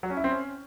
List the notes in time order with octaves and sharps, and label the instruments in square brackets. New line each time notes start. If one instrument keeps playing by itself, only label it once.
[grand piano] F#3
C#4
E4
C4
C#4